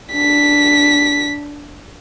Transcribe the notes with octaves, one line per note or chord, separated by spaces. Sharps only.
D4 B6